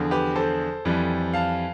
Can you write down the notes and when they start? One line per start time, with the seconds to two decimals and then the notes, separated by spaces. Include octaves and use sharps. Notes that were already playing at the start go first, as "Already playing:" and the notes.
Already playing: E2 D3 F3
0.11 G4 B4
0.36 A4 C5
0.85 F2 E3 G3
1.33 F5 A5